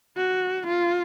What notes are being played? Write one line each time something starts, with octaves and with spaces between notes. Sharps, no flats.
F#4
F4